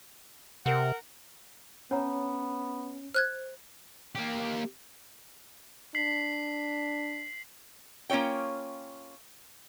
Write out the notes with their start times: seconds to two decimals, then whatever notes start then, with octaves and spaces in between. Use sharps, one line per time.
0.66 C3 A#4 F#5
1.91 B3 C#4 C#5 F#5 A#5
3.14 C5 F6 F#6 G#6
4.15 A#3 G4
5.95 D4 B6 C7 F#7
8.10 A#3 C#4 F4 C#5 G5